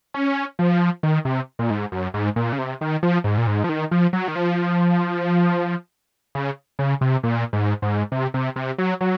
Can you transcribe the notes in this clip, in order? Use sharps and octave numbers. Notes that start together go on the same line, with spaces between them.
C#4
F3
D#3
C3
A#2
G#2
F#2
G#2
A#2
C#3
C3
D#3
F3
G#2
A#2
G#2
F3
D#3
F3
F#3
D#3
F3
C#3
C#3
C3
A#2
G#2
G#2
C3
C3
C3
F#3
F#3